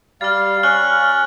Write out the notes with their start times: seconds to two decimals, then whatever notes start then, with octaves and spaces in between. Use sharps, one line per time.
0.21 G3 F5 F6 A6
0.63 C#4 C#6 F6 F#6 F#7